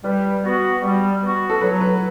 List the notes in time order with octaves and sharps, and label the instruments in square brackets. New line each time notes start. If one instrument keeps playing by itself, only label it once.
[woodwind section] G3 [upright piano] B4
[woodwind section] B3 F#4
G3
B3 F#4
[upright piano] A4
[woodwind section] F#3 [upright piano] B4
[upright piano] B4